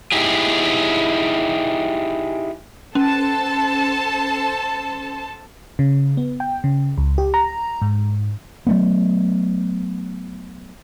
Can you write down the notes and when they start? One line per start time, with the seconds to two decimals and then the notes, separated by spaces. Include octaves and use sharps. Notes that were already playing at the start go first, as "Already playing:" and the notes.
0.12 D#4 E4 G4 G#4
2.95 C#4 A4 C5 A5
5.79 C#3
6.17 B3
6.40 G5
6.64 C#3
6.98 C#2
7.18 G4
7.34 A#5
7.82 G#2
8.67 F#3 A3 B3